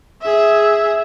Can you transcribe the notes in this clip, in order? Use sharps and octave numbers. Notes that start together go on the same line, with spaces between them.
G#4 E5